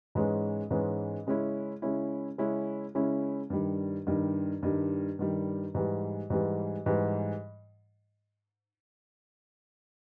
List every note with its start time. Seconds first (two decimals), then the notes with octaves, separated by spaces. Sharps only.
0.15 G#2 E3 G#3 C#4
0.71 G#2 E3 G#3 C#4
1.27 C#3 G#3 C#4 E4
1.82 C#3 G#3 C#4 E4
2.38 C#3 G#3 C#4 E4
2.95 C#3 G#3 C#4 E4
3.50 G2 D#3 G3
4.07 G2 D#3 G3
4.63 G2 D#3 G3
5.19 G2 D#3 G3
5.75 G#2 E3 G3
6.30 G#2 E3 G3
6.86 G#2 E3 G3